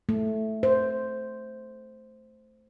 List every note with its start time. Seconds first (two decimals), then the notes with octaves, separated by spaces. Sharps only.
0.09 A3
0.63 C5